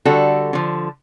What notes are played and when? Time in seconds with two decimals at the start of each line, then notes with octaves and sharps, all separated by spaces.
0.05 D3 G3 F#4 A4
0.53 D3 F3